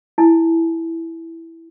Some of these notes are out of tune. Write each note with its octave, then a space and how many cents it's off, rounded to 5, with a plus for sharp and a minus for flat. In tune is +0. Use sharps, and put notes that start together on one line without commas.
E4 +0 G#5 +40